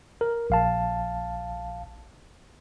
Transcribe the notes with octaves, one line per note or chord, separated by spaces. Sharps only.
A#4
A#1 F5 A5